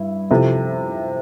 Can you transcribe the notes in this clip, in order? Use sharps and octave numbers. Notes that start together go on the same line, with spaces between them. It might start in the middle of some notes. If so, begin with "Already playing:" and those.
Already playing: G2 E4
C3 F3 C4 E4 A4